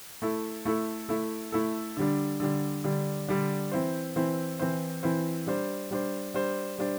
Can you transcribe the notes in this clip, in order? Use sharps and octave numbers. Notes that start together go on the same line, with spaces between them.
A3 E4 A4
A3 E4 A4
A3 E4 A4
A3 E4 A4
D3 G3 D4
D3 G3 D4
D3 G3 D4
D3 G3 D4
E3 C4 E4 C5
E3 C4 E4 C5
E3 C4 E4 C5
E3 C4 E4 C5
G3 D4 C5
G3 D4 C5
G3 D4 C5
G3 D4 C5